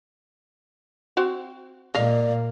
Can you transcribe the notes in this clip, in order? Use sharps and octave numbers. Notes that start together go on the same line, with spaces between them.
C4 F#4 C5
A#2 A#3 D5 D#5 F5